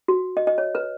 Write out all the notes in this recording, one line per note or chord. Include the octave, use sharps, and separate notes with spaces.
F#4
D#5
D#5
C#5
B4